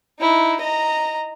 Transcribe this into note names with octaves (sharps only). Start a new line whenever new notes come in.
D#4 E4
D#5 A#5